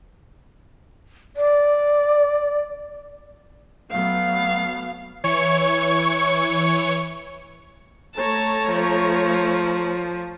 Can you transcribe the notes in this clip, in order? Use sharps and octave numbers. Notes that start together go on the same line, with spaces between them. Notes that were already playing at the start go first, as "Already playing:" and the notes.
D5
F#3 A3 B3 F5
E3 C#5 C#6
A3 C#5 A5 A#5
F3